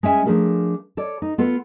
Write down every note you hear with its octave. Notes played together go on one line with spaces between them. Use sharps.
G#3 C#4 E5 G#5
F3 A3 D4 G#4 A#4
A4 C#5 D5
D#4
B3 F4 A4